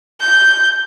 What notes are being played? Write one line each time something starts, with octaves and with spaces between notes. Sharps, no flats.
G6